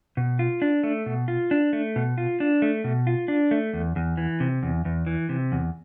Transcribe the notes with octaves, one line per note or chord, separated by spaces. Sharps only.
B2
F4
D4
A3
B2
F4
D4
A3
B2
F4
D4
A3
B2
F4
D4
A3
E2
E2
E3
C3
E2
E2
E3
C3
E2